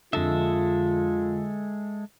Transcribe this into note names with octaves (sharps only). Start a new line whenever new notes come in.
F2 D3 G#3 F4 A4 E5